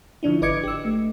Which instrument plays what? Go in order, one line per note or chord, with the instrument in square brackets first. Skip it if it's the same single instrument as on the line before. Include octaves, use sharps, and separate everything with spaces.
[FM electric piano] D3 F3 D4 E4
G#1 B4 D#5 D6 G#6 C#7
G4 E6
A3